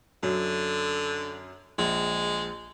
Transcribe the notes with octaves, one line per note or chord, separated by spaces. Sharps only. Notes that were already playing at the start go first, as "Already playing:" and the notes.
F#2 D3
A#1 G#3